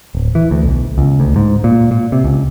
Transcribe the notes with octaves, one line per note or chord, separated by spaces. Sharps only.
D1
E3
D2
B1
C#2
D2
G#2
A#2
A#2
C3
C#2